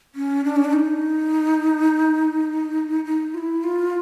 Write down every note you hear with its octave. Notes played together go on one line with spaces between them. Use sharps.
C#4
D4
C#4
D4
D#4
D#4
F4
E4
F4